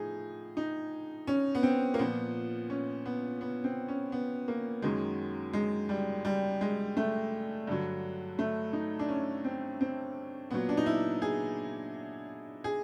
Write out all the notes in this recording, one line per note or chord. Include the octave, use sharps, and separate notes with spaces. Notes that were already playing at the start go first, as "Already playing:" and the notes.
Already playing: A2 F3 D#4 G#4
D#4
C#4
B3
C4
A#3
A#2 F3 B3
C#4
B3
B3
C4
C#4
B3
A#3
F#2 D#3 F#3 G#3
G#3
G3
G3
G#3
A3
G2 D3 F#3
A3
D#4
D4
C#4
C4
C4
A#2 F#3 B3
D4
D#4
E4
G#4
G#4